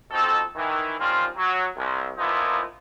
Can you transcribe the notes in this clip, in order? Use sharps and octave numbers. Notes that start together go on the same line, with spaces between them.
B2 F3 C4 D#4 A4
D#3 E3
D#3 F3 G3 C4 C#4 F4
F#3
C2
A#2 F3 A#3 B3 D#4 E4